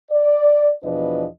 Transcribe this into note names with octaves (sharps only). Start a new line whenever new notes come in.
D5
E2 B2 F3 D4 B4 D#5